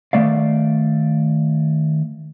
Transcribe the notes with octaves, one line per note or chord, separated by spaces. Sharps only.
D#3 A3 D5 F5